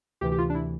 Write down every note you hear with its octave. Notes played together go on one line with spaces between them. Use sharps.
D2 C3 E3 G4
G4
F4
D4
E4